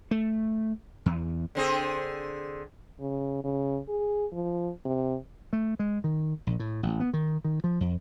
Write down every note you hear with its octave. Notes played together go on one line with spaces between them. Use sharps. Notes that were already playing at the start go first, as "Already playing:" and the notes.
A3
E2
D3 C4 G#4
C#3
C#3
G#4
F3
C3
A3
G#3
D#3
A#1
A2
A1
B3
D#3
D#3
F3
F2